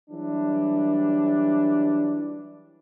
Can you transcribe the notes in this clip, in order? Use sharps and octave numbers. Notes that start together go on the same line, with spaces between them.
E3 F#3 G3 D4